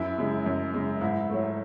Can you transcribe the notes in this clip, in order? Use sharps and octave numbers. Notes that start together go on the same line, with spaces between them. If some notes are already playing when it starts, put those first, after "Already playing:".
Already playing: F#2 E4
C#3 G#3
F#2
C#3 G#3
G#2 E4
F#3 A3